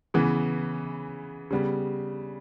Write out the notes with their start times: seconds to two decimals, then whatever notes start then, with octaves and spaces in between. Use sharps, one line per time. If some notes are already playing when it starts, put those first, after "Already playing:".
0.14 C#3 E3 B3
1.51 C#3 G3 B3